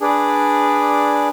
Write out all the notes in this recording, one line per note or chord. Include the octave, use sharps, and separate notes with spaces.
D4 G#4 B4 D5